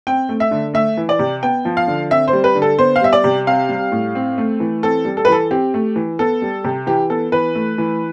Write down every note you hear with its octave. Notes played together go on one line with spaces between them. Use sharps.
C4 G5
A3
E5
D3
A3 E5
E3
D5
C3
B3 G5
F3
F5
D3
C4 E5
C5
G3
B4
D3
A4
B3 C5
F5
G3 E5
D5
C3
C4 F5
G3
A2
C4
A3
E3
C4 A4
G3
A4
B4
E3 A4
C4 G4
A3
E3
B3 A4
G3
C3
E3 G4
B3 A4
E3 B4
A3
E3